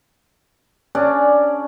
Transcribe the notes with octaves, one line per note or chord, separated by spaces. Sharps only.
C#4 D4 G#4 D5